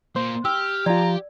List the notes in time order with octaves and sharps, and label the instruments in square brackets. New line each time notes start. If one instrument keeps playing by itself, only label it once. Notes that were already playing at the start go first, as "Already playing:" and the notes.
[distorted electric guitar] A#2 [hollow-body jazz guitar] C5
[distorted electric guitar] G4 [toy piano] E6 [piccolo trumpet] F6
[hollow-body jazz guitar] F3 F4 [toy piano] D5 [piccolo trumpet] A#5